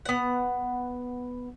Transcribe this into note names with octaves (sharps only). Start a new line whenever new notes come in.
B3 F#5